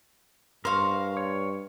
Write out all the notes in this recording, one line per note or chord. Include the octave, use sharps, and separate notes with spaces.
G2 A#4 C5 F5 C#6
C#5